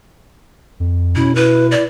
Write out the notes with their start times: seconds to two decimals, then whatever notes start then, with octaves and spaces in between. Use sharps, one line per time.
0.80 F2
1.16 B2 C#4 E4
1.35 E4 B4
1.71 D5